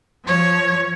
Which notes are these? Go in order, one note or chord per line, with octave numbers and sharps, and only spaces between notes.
F3 C#5